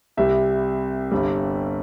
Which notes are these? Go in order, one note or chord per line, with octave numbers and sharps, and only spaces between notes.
C2 C3 G3 E5
G1 G2 G3